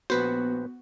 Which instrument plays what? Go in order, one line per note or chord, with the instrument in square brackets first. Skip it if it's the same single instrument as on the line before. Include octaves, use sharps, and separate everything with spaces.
[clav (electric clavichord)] A#1 B4 C5 [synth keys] B3 F#4